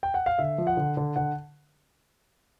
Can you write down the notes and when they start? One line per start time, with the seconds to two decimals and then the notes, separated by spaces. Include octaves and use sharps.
0.03 G5
0.14 F#5
0.26 F5
0.39 D3 E5
0.58 F3
0.67 F#5
0.77 D3
0.97 D3
1.16 D3 F#5